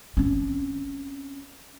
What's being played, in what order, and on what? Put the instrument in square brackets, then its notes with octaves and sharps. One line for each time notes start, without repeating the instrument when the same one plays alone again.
[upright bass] C4 C#4